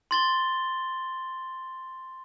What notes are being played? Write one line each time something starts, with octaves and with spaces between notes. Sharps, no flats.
C6 A6 G7